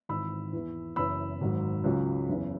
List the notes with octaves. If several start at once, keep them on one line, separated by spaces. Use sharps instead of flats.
G#1 G#2 E3 B5 E6
E2 E3
F#1 F#2 E3 B5 E6
G#1 G#2 F#3
C#2 C#3 F#3
F#1 E2 C#3